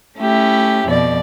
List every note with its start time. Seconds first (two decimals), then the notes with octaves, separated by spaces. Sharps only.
0.19 A3 C#4 E4 G4
0.88 F2 B2 D5